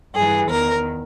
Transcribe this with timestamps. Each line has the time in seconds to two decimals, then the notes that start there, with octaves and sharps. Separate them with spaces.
0.14 G2 E3 G#4
0.49 E2 D#3 A#4